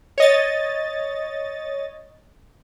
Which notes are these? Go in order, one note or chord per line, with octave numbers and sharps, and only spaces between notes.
C#5 D#5 A6